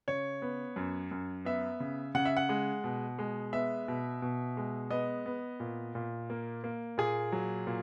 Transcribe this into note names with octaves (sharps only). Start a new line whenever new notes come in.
C#3 C#5
B3
F#2
F#2
B3 E5
C#3
C#3 F#5
E5
F#5
G#3
B2
G#3
B3 E5
B2
B2
G#3
B3 D#5
B3
A#2
A#2
A#3
A#3
A#2 G#4
F#3
A#2